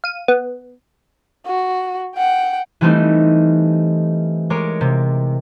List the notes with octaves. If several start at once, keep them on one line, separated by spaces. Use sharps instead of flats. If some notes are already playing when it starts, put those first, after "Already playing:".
F5 D#7
B3
F#4
F#5 G5
E3 G3 A3 C4 D#4
G#3 A#4 C#5 D6
C3